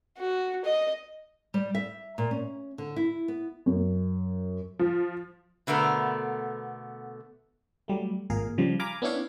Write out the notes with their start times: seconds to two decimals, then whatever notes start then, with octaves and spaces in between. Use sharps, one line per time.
0.18 F#4
0.65 D#5
1.54 G3
1.75 E5
2.18 A#2
2.31 C#4
2.78 D3
2.96 E4
3.28 B3
3.66 F#2
4.79 F3
5.67 B2 D3 A3 B3 A#4
7.88 F#3 G3 A3
8.30 G#1 A#2 G#4 A#4 F5
8.58 C#3 F3 G3
8.79 F5 G#5 A#5 B5 D6
9.02 B3 C#4 D4 E4 C#5 F5